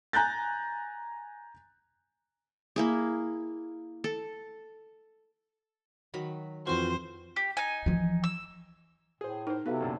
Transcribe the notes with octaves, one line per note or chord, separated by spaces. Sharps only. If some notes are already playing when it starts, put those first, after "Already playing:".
G#5 A#5 F#6 G6 A6
A#3 E4 G#4
A4
D#3 F#3 B5
F2 E3 C4 F4 F#4 C5 C6
G4
D#4 G#5
E3 F3
E6
A2 G#4 C5
D#4 A#4 C5
C3 B3 F#4 A4 B4 F5
F#2 A#2 D3